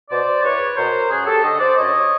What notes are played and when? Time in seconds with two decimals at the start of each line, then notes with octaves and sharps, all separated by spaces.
0.10 B2 C5 D5
0.43 E2 B4 C#5
0.76 B2 A#4 C5
1.10 F#2 F#4 G#4
1.27 G4 A4
1.43 D3 C#5 D#5
1.60 C5 D5
1.77 F#2 C#5 D#5